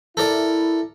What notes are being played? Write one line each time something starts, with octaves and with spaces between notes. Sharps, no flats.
E4 A4 A#4 D5